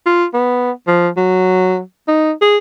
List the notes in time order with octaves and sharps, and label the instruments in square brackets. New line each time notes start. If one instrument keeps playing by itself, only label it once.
[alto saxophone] F4
B3
F3
F#3
D#4
G#4